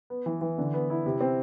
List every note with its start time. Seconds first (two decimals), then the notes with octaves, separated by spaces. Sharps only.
0.10 B3
0.26 E3
0.41 E3
0.58 D3
0.74 B3
0.90 E4
1.06 C3
1.21 C4